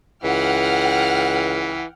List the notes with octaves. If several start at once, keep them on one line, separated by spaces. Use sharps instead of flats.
C#2 E3 F#5 G5 F6